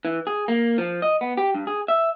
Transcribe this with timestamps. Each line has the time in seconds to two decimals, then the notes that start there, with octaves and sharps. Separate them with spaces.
0.05 E3
0.27 G#4
0.48 A#3
0.78 F3
1.02 D#5
1.21 B3
1.37 G4
1.55 G2
1.67 G#4
1.88 E5